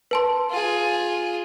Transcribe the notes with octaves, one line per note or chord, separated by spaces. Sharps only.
B4 A5 C6
F4 G#4